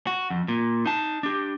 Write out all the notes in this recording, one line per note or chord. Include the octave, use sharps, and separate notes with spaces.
F#4
F2
A#2
D#4 A5
D4 G4